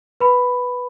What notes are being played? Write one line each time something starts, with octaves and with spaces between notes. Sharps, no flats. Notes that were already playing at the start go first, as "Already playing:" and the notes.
B4 B5